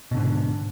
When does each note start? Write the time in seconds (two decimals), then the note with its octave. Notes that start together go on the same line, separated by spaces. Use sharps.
0.11 B2
0.14 D3
0.17 G#2